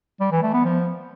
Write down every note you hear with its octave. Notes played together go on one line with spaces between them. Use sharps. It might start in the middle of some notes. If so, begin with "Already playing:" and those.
G3
E3
A3
B3
F3